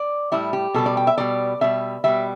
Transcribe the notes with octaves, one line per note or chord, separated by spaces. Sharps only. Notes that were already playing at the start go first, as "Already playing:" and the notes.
Already playing: D5
A2 G3 E4
G4
B2 G3 A4
D5
G5
E5
B2 G3 D5
B2 G3 E5
B2 G3 E5